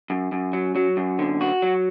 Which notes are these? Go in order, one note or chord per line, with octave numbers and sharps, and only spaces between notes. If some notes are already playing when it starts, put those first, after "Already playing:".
F#2
F#2
F#3
F#3
F#2
D3
F#4
F#3